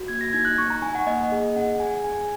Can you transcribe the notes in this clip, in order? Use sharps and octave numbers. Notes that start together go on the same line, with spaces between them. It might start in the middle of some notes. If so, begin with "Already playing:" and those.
Already playing: F#4
A#3 G#6
A#6
D#4 G#6
F#6
D#4 C#6
A#5
D#4 G#5
F#5
A#3 D#5
G#4
C#4 F#5
G#4 G#5
C#4 G#5